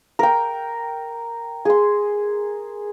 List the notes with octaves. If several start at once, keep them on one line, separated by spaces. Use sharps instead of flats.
A#4 G5
G#4 C6